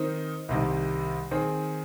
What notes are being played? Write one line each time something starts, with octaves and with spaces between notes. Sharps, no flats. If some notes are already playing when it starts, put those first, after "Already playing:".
Already playing: D#3 C4 D#4 A#4
C2 C3 D#3
D#3 C4 G#4